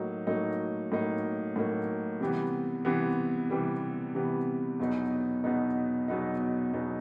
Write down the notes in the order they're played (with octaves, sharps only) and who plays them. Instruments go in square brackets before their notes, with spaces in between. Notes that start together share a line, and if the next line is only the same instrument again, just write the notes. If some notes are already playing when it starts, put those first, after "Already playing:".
Already playing: [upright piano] A2 F#3 A#3 D#4
A2 F#3 A#3 D#4
A2 F#3 A#3 D#4
A2 F#3 A#3 D#4
C3 E3 G3 B3
C3 E3 G3 B3
C3 E3 G3 B3
C3 E3 G3 B3
E2 B2 F#3 B3 D#4
E2 B2 F#3 B3 D#4
E2 B2 F#3 B3 D#4
E2 B2 F#3 B3 D#4